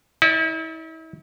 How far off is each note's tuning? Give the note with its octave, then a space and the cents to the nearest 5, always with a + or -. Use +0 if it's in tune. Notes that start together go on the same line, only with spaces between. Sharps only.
E4 -40 D5 +0